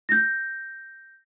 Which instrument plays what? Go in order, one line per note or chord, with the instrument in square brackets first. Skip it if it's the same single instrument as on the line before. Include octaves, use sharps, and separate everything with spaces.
[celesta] G6 A#6